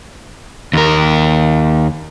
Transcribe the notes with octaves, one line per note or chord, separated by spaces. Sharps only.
D#2 A#4